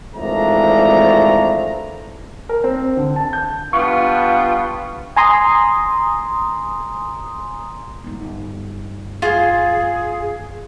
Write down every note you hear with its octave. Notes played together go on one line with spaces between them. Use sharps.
G#1 E3 F3 A3 D4 A#5
A#4
C4
D3
A5
G6
G2 B3 F4 C#6
G#5 A#5 C6 D#6
G1 D#4
F4 G#4